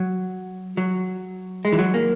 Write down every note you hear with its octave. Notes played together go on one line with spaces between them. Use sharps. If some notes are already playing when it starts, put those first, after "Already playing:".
Already playing: F#3
F#3
G#3
E3
F#3
A#3